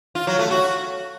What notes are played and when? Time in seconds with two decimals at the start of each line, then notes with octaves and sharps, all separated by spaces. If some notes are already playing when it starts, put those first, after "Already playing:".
0.15 F4
0.27 F#3
0.39 A3
0.51 F#4